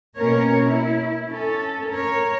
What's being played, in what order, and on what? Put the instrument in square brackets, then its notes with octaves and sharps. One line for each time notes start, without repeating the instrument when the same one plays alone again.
[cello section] B2 A#3 C#4 A#4 C#5
E4
C#4 A4
A#4 C#5